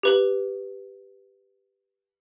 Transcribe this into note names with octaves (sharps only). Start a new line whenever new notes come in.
G4 B4 F#7